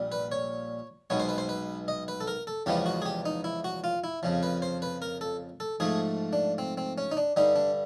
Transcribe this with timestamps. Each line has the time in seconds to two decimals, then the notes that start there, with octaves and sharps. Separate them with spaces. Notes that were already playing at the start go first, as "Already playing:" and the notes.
Already playing: A#1 A#2 G3
0.12 B4
0.32 C#5
1.10 B1 B2 G#3 B3 C#5
1.20 C5
1.29 B4
1.38 C5
1.49 B4
1.88 D#5
2.08 B4
2.20 A4
2.28 A#4
2.47 A4
2.66 E2 C#3 F3 G#3 B3 G4
2.86 F#4
3.02 G#4
3.06 G4
3.26 D#4
3.44 E4
3.64 F#4
3.84 F4
4.04 E4
4.23 F2 C#3 F3
4.43 B4
4.62 C5
4.82 B4
5.02 A#4
5.21 A4
5.60 A4
5.80 G#2 F3 A3 G#4
6.33 D4
6.58 C4
6.78 C4
6.98 C#4
7.12 D#4
7.17 D4
7.36 G2 D3 G3 D#4
7.56 D4